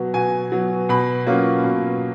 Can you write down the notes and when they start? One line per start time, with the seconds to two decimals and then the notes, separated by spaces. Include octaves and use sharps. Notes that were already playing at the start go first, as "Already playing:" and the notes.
Already playing: B2 F#3 B3
0.14 B2 G#5
0.52 F#3 B3
0.89 B2 B5
1.26 F#3 A#3 C#4 F4
1.64 B2